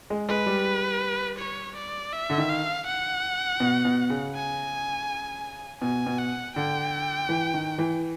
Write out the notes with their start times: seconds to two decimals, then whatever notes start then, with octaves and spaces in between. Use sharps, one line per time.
0.10 G#3
0.29 G#3 B4
0.46 G3
1.39 C#5
1.77 D5
2.13 E5
2.30 D3
2.38 D#3
2.50 F5
2.87 F#5
3.60 B2
3.85 B2
4.10 C#3
4.34 G#5
5.82 B2 G#5
6.06 B2
6.19 F#5
6.56 D3 G5
7.29 E3
7.54 D#3
7.78 E3